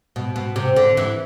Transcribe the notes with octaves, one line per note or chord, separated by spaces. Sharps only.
B2
B2
C3
D3
E3